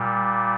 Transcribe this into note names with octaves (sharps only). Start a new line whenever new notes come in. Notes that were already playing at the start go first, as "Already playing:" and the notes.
Already playing: A#2 G3